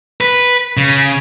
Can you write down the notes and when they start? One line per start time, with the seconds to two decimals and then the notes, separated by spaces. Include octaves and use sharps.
0.21 B4
0.77 C#3